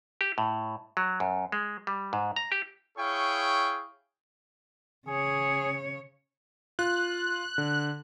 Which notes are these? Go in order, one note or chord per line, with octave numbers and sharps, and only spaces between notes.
G4
A2
F#3
F#2
G#3
G3
G#2
A#5
G4
E4 G#4 C#5 F5 G5 C#6
C#3 G#4 C#5
F4 F#6
D3